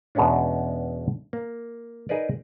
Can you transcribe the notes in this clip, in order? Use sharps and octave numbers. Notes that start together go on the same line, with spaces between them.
E2 B2 G#3 B3 C#4 D4
A#3
D#4 G#4 A#4 B4 D5